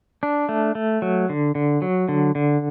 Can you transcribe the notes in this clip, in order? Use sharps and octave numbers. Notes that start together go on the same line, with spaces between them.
D4
A3
A3
F#3
D3
D3
F#3
D3
D3